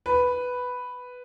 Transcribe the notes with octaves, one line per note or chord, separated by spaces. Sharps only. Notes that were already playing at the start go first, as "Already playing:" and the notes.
B4